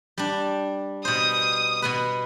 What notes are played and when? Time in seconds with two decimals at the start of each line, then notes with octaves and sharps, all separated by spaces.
0.18 G3 D4
1.05 B2 C5 D#6
1.82 B2 B3 B4